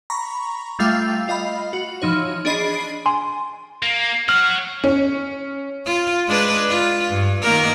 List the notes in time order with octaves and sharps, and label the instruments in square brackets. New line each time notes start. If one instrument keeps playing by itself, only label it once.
[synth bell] A#5 B5 C#6
G3 A3 F4 E5 F5 G5
F4 D#5 F5 B5
F#4
E3 F3 D#4 C#5
D4 G#4 D#5 B5 C7 D7
[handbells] G#5 C6
[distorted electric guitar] A#3
[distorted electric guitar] C#5 F#5 [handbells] F6
[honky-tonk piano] C#4
[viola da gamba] F4
G#3 D4 B4
F4
G2
D#3 A#3 A#4